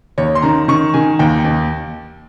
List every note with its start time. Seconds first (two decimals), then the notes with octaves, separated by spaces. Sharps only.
0.18 D#2 C#5
0.35 C6
0.42 D#3 A#5
0.68 D#3 C#6
0.94 D#3 G#5
1.19 D#2 G5
1.44 D#2